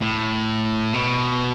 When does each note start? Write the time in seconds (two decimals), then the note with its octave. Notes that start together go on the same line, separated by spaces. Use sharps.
0.02 A2
0.94 B2